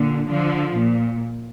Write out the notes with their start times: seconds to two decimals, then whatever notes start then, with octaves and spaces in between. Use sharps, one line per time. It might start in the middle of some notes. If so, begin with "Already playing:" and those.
Already playing: A#2 D3
0.30 D3 F3
0.77 A#2